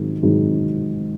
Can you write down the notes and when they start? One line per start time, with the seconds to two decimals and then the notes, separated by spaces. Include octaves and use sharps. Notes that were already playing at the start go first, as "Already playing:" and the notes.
Already playing: G#2 D#3 F#3
0.23 G#2 D#3 F#3